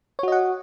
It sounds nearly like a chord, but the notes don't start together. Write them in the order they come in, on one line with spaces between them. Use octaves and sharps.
C#5 F#4 D#5 F#5